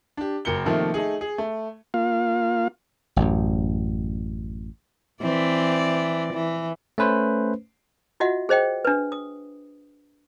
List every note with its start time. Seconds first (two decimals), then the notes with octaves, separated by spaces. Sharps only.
0.17 D4 G4
0.45 F#1 A#4 C#7 G7
0.65 C3 D#3 F3 A3 A#3
0.94 A3 D#4 G#4
1.21 G#4
1.38 A3
1.94 A#3 F4 F5
3.16 A1 F#2
5.21 E3 C4 D5
6.33 E3
6.98 A3 C#4 B4 C5
8.20 F4 F#4 D#5 E5 F#5
8.49 G#4 C5 D#5 G5
8.85 D4 B4
9.12 D#6